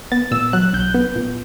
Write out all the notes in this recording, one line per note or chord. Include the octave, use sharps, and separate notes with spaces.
B3 A6
A#2 E6
F#3 F#6
B1 G6
B3
A#2